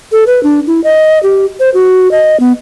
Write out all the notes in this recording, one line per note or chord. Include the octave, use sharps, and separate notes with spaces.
A4
B4
D4
E4
D#5
G4
C5
F#4
D#5
B3